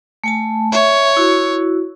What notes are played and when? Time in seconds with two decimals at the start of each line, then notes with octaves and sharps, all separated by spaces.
0.24 A3 G#5 A5
0.72 C#5 E5
1.17 E4 F#4